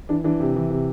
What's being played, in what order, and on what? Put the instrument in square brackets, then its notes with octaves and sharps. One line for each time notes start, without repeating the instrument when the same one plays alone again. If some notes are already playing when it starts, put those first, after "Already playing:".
[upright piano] E3 D4
E3 D4
C3
E3
C3